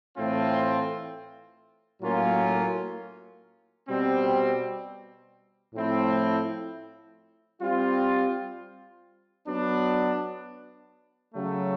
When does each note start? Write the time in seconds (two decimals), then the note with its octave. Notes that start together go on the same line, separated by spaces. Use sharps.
0.16 A2 E3 A3 C4 F4
2.01 A2 F#3 A#3 C#4 F4
3.88 B2 G3 C4
5.74 A2 F3 A3 C4 E4
7.61 G3 C4 F4
9.46 F#3 B3 D4
11.33 C#3 F#3 A3